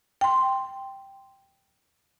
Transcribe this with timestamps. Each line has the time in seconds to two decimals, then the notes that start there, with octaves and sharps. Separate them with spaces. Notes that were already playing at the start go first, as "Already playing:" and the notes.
0.21 G5 C6